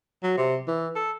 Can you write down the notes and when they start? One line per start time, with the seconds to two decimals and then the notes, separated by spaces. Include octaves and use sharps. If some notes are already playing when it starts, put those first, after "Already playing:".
0.23 F#3
0.37 C3
0.68 E3
0.96 A4